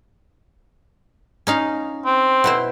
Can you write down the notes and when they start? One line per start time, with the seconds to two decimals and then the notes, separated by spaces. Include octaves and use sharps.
1.47 C#4 D#4 F5
2.06 C4
2.44 B2 E4 C5